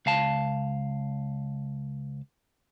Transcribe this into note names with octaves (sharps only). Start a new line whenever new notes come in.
C#2 F5 A5